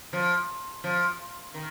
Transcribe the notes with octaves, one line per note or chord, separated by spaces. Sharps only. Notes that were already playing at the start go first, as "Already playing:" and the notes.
F3
F3
D#3